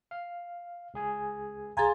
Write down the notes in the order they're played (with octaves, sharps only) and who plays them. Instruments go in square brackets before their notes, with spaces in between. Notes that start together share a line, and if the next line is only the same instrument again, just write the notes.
[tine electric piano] F5
C#2 G#4 G#5
[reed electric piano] C2 A#5 G#6 [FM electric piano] G#4 G#5 [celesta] F5 C6 A6